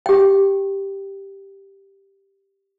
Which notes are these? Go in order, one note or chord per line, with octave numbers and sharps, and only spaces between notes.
G4 G5